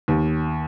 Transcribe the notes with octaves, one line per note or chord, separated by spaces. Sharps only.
D#2